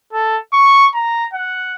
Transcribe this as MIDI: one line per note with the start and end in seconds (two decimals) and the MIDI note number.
0.13 0.37 69
0.53 0.87 85
0.95 1.26 82
1.34 1.75 78